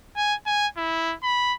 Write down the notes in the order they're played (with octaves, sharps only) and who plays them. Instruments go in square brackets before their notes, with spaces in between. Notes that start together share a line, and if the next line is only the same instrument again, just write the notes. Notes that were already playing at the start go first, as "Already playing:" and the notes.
[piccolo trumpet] G#5
G#5
E4
B5